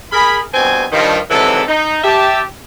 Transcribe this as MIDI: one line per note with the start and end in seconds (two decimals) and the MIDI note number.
0.12 0.40 68
0.12 0.40 70
0.12 0.40 83
0.54 0.85 43
0.54 0.85 47
0.54 0.85 60
0.54 0.85 80
0.92 1.18 43
0.92 1.18 51
0.92 1.18 53
1.30 1.62 44
1.30 1.62 48
1.30 1.62 52
1.30 1.62 54
1.30 1.62 69
1.67 2.01 63
2.04 2.40 67
2.04 2.40 76
2.04 2.40 81